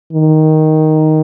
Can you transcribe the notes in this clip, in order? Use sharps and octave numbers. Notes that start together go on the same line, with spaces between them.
D#3